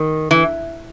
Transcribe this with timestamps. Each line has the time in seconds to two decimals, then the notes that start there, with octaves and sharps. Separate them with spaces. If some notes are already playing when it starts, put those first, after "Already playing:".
Already playing: D#3
0.31 E3